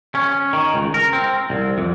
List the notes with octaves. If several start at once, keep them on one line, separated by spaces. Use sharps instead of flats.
C#4
D#3
C#2
A#4
C4
C2
F2